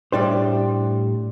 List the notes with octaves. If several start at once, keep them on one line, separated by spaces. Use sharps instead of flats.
A2 G3 D4 G4 C5